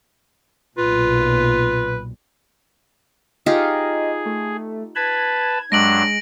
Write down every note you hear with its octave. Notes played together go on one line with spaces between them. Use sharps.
B1 A#2 F4 B4
D#4 F4 G4 G#4 D#5
A3
B4 A5 B5 G#6
G2 F#3 G#3 D4 A#6 D7 F#7